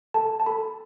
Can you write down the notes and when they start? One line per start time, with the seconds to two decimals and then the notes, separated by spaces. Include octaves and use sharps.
0.14 A4 A5
0.40 A5
0.46 A4 B5